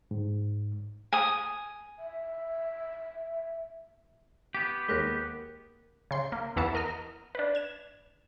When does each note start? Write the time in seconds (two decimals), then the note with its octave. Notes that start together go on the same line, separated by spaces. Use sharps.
0.11 G#2
1.13 G#5 D#6
1.99 E5
4.55 B3 G4 G6
4.89 D#2 G#3 A#4 F#6 A#6
6.11 C#3 C6
6.32 A#3
6.56 E2 E3 B3 E4 A5 C#7
6.75 A#4 D#5 F6
7.35 D4 B4
7.55 G#6 E7